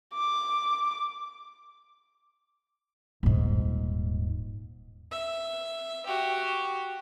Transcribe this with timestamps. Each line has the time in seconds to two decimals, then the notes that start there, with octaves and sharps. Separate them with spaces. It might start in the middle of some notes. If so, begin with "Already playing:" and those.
0.14 D6
3.23 D#1 G#2
5.11 E5
6.06 F#4 G4